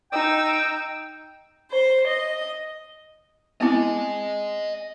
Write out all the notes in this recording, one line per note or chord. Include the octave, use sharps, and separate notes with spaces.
D#4 G5 E6
C5
D#5
B3 C4 E4 D#5 G#5